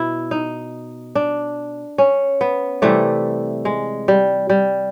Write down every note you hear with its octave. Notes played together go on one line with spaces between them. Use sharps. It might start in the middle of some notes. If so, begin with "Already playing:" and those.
Already playing: B2 E4
D#4
D4
C#4
B3
C3 E3 G3 A3
G#3
G3
G3